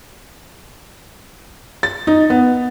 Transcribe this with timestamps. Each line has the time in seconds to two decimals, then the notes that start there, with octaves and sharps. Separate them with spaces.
1.83 A6
2.07 D#4
2.30 B3